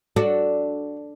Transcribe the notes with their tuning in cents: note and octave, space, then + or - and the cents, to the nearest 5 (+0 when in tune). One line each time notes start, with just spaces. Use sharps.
D4 +0 F#4 +0 A4 +0